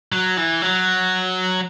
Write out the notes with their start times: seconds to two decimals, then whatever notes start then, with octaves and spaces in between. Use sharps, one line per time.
0.12 F#3
0.37 E3
0.62 F#3